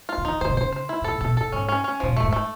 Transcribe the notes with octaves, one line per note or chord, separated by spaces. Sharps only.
F4
D3
D#3 D#4
D3 C5
C3
C#3 C5
C5
E4
A2 A4
A#2
B2 A4
A2 A4
G#2 C#4
C#4
C#4
A#2 F3
A2 A3
G#2
A3